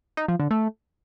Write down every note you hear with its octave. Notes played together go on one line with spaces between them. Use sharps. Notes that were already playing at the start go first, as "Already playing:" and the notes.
D#4
F3
D3
A3